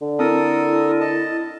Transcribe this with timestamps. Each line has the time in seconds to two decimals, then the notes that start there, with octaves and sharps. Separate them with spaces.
0.01 D3
0.19 C4 E4 A4 A#4 D#6
1.01 D#5 A5